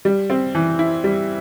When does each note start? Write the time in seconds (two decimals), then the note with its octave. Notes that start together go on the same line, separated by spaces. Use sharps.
0.05 G3
0.30 C4
0.55 E3
0.79 E4
1.04 G3